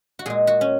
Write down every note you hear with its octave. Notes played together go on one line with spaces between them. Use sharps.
F#4
A#2 G#3 G#4
F#4
C#4